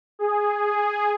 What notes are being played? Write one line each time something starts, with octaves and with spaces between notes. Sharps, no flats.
G#4
G#4